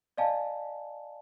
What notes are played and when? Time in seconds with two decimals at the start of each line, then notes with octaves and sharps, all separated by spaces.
0.17 D5 D#5 F5 G#5 A5